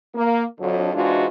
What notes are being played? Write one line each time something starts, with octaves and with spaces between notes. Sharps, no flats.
A#3
F2 D3 F#3
G#2 E3 G#3 D4 F4 F#4